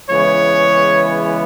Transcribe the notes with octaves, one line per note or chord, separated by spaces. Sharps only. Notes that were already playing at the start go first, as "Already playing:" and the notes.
C#3 E3 G#3 B3 C#5